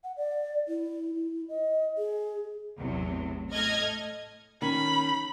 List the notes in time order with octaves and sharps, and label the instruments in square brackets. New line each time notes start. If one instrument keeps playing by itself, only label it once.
[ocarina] F#5
D5
E4
E4
D#5
G#4
[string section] A1 E2 C3 F#3
A2 A4 D#5 F6 G#6 A#6
[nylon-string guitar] D#3 C#4 [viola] B5